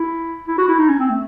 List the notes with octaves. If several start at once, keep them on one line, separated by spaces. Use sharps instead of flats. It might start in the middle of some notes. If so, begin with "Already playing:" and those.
Already playing: E4
E4
F#4
E4
D#4
C#4
C4
A3